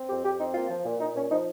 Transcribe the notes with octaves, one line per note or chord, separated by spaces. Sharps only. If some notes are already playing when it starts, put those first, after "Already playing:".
Already playing: C4
F2 G4
F2 G4
C4 D#4
A#3 F4
F3
A#2
A#2 D#4
A#2 C#4
F3 D#4